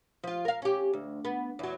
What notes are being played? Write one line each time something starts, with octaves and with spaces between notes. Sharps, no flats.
F3 F4
A#4 F5
C#4 G4
D2
B3
E2 F#3